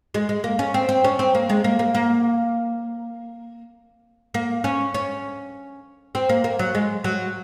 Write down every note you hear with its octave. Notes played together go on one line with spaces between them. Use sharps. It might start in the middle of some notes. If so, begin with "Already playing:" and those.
G#3
G#3
A#3
C#4
C4
C4
C#4
C4
A#3
G#3
A#3
A#3
A#3
A#3
C#4
C#4
C4
A#3
A#3
F#3
G#3
F#3